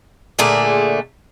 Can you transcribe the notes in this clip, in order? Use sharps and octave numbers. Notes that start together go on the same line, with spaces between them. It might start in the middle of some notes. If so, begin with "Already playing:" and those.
A#2 D3 A3 G#4